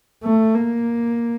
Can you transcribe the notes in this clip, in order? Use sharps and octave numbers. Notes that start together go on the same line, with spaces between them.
A3
A#3